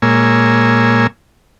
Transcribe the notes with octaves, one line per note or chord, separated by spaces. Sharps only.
A#2 G#3 A#3 C#5 G#5 E6